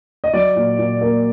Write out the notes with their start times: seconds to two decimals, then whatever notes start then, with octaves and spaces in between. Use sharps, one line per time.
0.24 D#5
0.33 F#3 D5
0.56 A#2
0.78 A#2
1.01 A#3